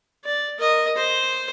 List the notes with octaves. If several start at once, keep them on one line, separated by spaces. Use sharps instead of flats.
D5
A#4 D#5
C5